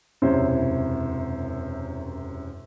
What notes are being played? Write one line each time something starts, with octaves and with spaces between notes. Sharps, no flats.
E1 F#2 C3 E4 C5 C#5